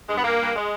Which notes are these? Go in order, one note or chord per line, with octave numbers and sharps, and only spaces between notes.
G2 G#3
B3
G2 A#3
G2
G#3